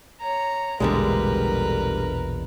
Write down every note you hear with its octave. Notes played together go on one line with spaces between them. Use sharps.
C#5 A#5
A#1 E2 B2 D3 G3 G#3 A#4 B4